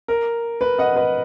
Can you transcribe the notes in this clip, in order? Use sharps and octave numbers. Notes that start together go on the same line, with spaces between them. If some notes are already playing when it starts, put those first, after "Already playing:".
A#4
B4
D#5 F#5
B4 D#5